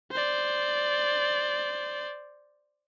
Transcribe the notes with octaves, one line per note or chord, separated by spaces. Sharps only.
C5 D5